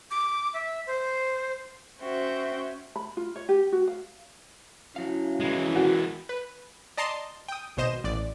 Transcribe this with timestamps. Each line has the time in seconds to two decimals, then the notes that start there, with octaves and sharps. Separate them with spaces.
0.11 D6
0.54 E5
0.87 C5
2.00 C#4 F#4 C5 E5 G5
2.96 B5
3.17 F4
3.36 C#5
3.49 G4
3.72 F#4
3.88 F5
4.96 F#3 C#4 E4 F5
5.40 E3 G#3
5.75 F#4 A#4 F5 G5
6.29 B4
6.97 D5 D#5 A5 A#5 C6
7.48 G5 D#6
7.77 G#1 B2 C5 D#5 E7
8.04 A1 D5